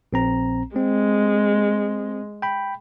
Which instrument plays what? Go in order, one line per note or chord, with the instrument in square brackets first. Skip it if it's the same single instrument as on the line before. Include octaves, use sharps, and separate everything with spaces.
[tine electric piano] A#1 C4 A#5
[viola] G#3 [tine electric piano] C4
[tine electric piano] G5 B5